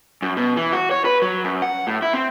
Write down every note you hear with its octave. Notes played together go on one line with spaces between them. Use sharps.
F#2
B2
E3
F#4
C#5
B4
F#3
F#2
F#5
A2
E4
C4